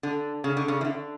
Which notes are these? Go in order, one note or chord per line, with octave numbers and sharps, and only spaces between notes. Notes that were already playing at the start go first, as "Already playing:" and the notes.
D3
C#3
D3
C#3
E3
D3